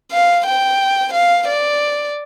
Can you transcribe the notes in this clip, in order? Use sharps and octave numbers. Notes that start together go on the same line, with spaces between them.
F5
G5
F5
D5